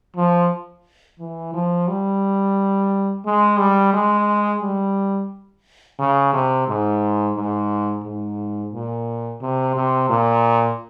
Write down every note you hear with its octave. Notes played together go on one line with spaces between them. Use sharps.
F3
E3
F3
G3
G#3
G3
G#3
G3
C#3
C3
G#2
G#2
G#2
A#2
C3
C3
A#2